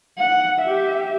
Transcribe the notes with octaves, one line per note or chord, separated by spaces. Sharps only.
F#5
G4 E5